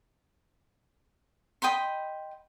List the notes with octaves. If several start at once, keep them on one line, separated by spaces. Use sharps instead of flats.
D#5 G5 B5 C6